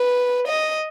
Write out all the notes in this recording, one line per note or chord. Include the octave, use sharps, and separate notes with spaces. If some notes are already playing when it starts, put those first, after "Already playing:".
Already playing: B4
D#5